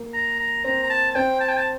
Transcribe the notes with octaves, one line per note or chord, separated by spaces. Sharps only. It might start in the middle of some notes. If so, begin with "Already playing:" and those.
Already playing: A#3
A#5
A#5
C4 A#5
A#5
A5
A5
C4 G5
A5
G5
A5